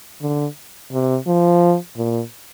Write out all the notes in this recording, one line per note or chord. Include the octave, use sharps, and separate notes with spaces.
D3
C3
F3
A#2